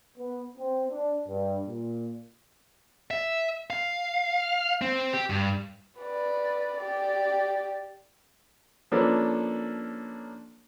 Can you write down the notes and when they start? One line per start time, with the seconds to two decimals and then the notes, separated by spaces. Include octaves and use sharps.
0.18 B3
0.58 C4
0.91 D4
1.28 G2
1.67 A#2
3.11 E5
3.70 F5
4.82 C4
5.13 G4
5.30 G2
5.99 B4 D5
6.78 G4 D5
8.92 F3 A#3 C#4 D4 A4 B4